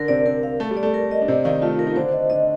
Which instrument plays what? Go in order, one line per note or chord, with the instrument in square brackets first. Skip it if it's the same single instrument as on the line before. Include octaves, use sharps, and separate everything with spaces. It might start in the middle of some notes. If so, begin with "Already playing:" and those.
Already playing: [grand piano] D3 D4 [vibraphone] A#4
[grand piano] C3 C4 [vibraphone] D5
[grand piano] C3 C4 [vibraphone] A#4
[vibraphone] F5
[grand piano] A3 [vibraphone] A4
[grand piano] G3
[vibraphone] D5
[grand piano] A3
[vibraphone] A#4
D#5
[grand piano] D4
[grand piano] C3 C4 [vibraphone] D5
[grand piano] D#3 D#4 [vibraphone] F5
[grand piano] A3 [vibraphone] F4
[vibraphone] A#4
[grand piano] D#4
[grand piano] D3 D4 [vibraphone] C5
[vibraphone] D#5
[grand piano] D3 D4 [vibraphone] D#5